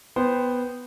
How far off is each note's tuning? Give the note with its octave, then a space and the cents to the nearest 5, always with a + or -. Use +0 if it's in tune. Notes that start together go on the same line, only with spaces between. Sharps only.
B3 +0 C5 -10 G5 +0